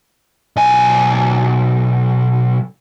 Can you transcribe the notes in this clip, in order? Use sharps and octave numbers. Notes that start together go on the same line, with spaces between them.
B1 G#5